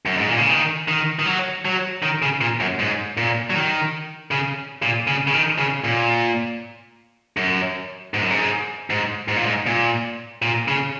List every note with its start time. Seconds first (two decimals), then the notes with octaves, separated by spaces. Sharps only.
0.06 F#2
0.18 G#2
0.28 A#2
0.38 C#3
0.50 D#3
0.88 D#3
1.19 D#3
1.26 F#3
1.65 F#3
2.03 D#3
2.22 C#3
2.41 A#2
2.60 F#2
2.79 G#2
3.17 A#2
3.50 F#3
3.55 D#3
4.31 C#3
4.83 A#2
5.07 C#3
5.27 C#3
5.33 D#3
5.58 C#3
5.84 A#2
7.37 F#2
8.14 G#2
8.21 F#2
8.31 G#2
8.90 G#2
9.28 G#2
9.37 A#2
9.46 G#2
9.66 A#2
10.42 A#2
10.68 C#3